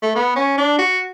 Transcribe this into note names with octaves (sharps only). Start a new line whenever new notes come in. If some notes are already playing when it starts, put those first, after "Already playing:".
A3
B3
C#4
D4
F#4